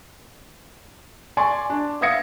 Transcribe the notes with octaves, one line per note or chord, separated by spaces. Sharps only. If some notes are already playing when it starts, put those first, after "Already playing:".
D5 G#5 C6 C#6
D4
E5 F5 D#6 G#6 A#6 C#7